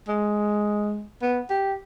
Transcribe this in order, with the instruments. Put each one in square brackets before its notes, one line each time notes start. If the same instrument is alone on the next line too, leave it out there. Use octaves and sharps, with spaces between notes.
[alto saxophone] G#3
B3
G4